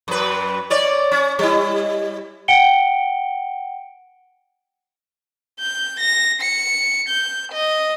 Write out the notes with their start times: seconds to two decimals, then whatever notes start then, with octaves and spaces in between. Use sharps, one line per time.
0.08 F#2 B4
0.70 C#4 C#5 D5
1.12 C#4
1.39 G3 E4
2.48 F#5 G5 C#7 D7 G7
5.59 G6
6.00 A#6
6.42 C#7
7.09 G6
7.52 D#5